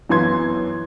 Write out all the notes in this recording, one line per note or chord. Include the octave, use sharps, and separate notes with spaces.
F#2 E3 B3 C6 G#6